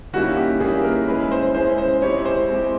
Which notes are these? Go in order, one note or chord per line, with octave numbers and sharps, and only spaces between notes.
D#3 G3 A#3 C#4 E4 F#4
G4
D#3 G3 A#3 C#4 E4 G#4
A#4
G#3 C#4 E4 G#4 B4
C5
G#3 C#4 E4 G#4 C5
C5
G#3 C4 E4 G4 C#5
C5
G#3 C4 E4 G4